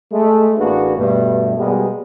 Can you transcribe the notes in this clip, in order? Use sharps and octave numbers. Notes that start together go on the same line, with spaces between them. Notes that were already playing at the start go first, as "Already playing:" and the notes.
G#3 A3
A1 A#3 D4 F#4 G#4 B4
G2 B2 A3
B2 G3 G#3 A#3 B3